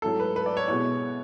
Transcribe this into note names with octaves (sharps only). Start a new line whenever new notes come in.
G#2 F#3 A3 E4 A4
B4
B4
D5
C#5
B2 G#3 B3 E4 C#5